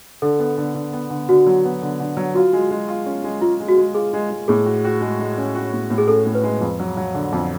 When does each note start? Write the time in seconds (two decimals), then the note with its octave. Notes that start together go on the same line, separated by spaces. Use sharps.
0.22 D3 A4
0.39 B3
0.58 D3
0.75 D3
0.93 B3
1.10 D3
1.29 D3 F#4
1.47 F#3
1.64 B3
1.82 D3
2.00 D3
2.17 F#3
2.35 F4 F#4
2.53 G#3
2.71 G#3
2.88 F4
3.06 C#4
3.24 G#3
3.41 G#3 F4
3.60 G#3
3.68 F#4
3.78 G#3
3.95 F4 G#4
4.13 G#3
4.30 G#3
4.48 A2 G#4
4.66 F#4
4.84 F#4
5.01 G#3
5.20 G#3
5.38 C#4
5.55 F#4
5.73 A2
5.90 A2
5.98 G#4
6.08 C#4 A4
6.26 A2
6.35 B4
6.43 G#3
6.61 F2
6.80 F#3
6.97 F#3
7.14 D3
7.32 F2